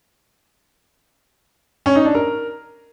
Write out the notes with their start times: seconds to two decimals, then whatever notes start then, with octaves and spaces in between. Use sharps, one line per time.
1.86 C#4
1.95 D#4
2.05 D4
2.15 A#4